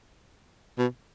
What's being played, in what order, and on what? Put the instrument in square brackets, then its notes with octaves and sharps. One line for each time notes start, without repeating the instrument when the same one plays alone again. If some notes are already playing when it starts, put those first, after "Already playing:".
[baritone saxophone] B2